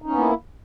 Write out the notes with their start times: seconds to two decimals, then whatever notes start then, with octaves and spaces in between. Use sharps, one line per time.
0.02 D#4
0.06 C#4
0.10 B3
0.14 A#3
0.18 E4